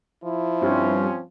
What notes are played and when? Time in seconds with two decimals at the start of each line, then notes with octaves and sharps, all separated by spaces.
0.24 F3 E4
0.62 G2 C4 C#4